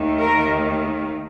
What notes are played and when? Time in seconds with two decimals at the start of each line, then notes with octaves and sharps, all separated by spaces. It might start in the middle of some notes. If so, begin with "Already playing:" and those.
Already playing: D#2 D#3 A3
0.18 A#4